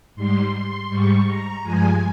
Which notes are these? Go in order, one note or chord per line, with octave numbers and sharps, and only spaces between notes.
G#2 G3 C6
C6
G#2 G3 C#6
A#5
G2 F3 G#3 G#5